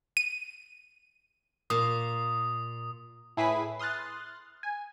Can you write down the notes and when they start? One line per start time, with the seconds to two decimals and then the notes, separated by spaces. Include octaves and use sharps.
0.17 D#7
1.70 A#2 D#6
3.37 A2 E4 G#4 B4 B6
3.79 C6 D#6 F6 F#6 A6
4.63 G#5